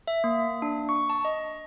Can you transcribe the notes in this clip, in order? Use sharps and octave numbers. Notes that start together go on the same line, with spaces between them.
E5
A#3
D4
C#6
A5
D#5